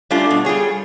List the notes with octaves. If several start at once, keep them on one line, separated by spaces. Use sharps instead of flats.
G3 A3 C#4 D4 E4 F4
B2
G3 F4 G#4 C#5